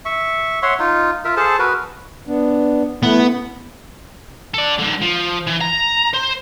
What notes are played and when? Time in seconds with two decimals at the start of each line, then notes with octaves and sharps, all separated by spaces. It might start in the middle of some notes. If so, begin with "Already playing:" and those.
0.05 E5 C#6
0.63 C#5 E5 F#5 C6
0.79 D#4 F4
1.25 F4 A#4 E5
1.37 G#4 A4 C5 A5
1.59 F#4 A#4 B4
2.27 B3 D4
3.03 A3 B3 E4
4.54 A4 D5
4.79 G#2 D3
5.02 F3
5.47 E3
5.61 A#5
6.13 C5